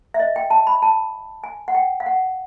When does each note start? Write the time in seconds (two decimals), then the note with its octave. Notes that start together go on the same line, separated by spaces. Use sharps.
0.14 E5
0.20 D#5
0.36 G5
0.50 A5
0.67 B5
0.82 A5
1.44 G#5
1.68 F#5
1.75 G5
2.00 F5
2.06 F#5